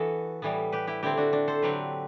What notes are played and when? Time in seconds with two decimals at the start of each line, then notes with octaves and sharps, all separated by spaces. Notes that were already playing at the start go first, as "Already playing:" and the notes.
Already playing: E3 B3 F#4 A4
0.42 A2 E3 G3 B3
0.72 G4 B4
0.87 E4 G4
1.03 D3 A3 C4 E4 G4
1.17 D4 F#4
1.33 D4
1.48 A4 C5
1.62 D3 F#3 C4 G4 B4